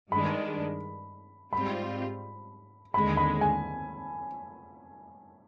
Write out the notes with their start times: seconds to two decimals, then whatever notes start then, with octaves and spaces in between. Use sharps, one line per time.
0.12 G2 D#3 G#3 D4 B5
1.53 G#2 G3 C4 F4 B5
2.94 D#2 D3 G#3 B5
3.17 B5
3.41 G#5